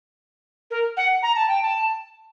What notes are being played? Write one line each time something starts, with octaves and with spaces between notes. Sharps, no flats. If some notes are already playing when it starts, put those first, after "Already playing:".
A#4
F#5
A#5
A5
G5
A5